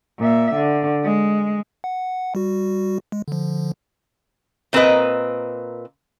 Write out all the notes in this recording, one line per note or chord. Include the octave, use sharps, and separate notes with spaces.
A#2 E5
D3
G#3
F#5
G3 F#4
G#3
D3 F3
A#2 C4 A#4 B4 D#5